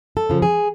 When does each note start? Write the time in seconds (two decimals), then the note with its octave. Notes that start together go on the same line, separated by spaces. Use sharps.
0.17 A4
0.29 C#3 F3
0.42 G#4